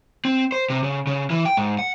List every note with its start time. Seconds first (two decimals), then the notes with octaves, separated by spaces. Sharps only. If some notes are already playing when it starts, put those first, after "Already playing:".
0.25 C4
0.52 C5
0.70 C3
0.83 C#3
1.07 C#3
1.30 E3
1.45 G5
1.57 G#2
1.79 F#5